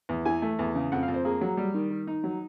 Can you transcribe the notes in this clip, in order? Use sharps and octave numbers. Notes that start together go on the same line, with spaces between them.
E2
E3 G#5
A3
E2
C#3
F2 F#5
F5
F2
C5
A#3 G#4
F#3
G3
D#3
D#3
D#4
F#3